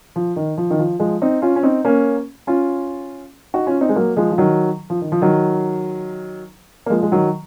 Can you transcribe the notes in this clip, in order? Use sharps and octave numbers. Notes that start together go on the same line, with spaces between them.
F3
D#3
F3
D#3
F3
F3 G#3
C4 D#4
C#4 F4
C#4
C4 D#4
A#3 C#4
C#4 F4
D#4 F#4
C#4 F4
C4 D#4
G#3
F#3 A#3
F3 G#3
F3
D#3 F#3
F3
D#3
F3
D#3 F#3
A#3
F3 G#3
G#3
D#3 F#3